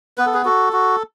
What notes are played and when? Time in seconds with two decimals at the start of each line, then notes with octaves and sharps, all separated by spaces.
0.18 B3 B4
0.26 A4
0.34 G#4 B4
0.45 F#4 A4
0.73 F#4